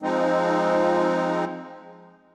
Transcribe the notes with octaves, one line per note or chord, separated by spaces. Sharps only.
F3 G#3 C4 D#4